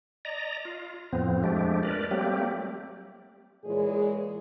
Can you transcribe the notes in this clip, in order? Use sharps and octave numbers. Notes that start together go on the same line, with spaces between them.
D5 D#5 A#5
F4
F2 A2 F3 B3 C4
F3 G#3 A3 D4 G4
A#4 B4 D5
F#3 G3 A3 A#3 C4 G4
A#2 E3 G#3 G#4 C#5 D5